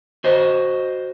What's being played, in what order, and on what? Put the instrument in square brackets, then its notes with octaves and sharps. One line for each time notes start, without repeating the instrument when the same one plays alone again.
[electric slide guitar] F#4 C5 D#5